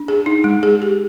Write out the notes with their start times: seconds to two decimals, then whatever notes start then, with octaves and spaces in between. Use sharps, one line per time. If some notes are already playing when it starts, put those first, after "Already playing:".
Already playing: D4
0.08 G#4
0.26 D#4
0.44 G#3
0.63 G#4
0.82 G4